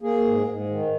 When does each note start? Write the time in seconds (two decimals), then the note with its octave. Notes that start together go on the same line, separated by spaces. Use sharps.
0.02 A#3 G#4
0.24 G#2
0.47 G#2
0.69 D#3